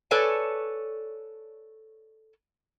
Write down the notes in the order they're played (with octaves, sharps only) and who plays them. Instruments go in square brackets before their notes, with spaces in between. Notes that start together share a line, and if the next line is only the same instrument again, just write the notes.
[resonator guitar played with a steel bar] A4 B4 C#5 D5 G#5 A5